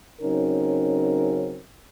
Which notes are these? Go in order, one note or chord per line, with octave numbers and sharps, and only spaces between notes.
C#3 F#3 C4 C#4 D#4 A#4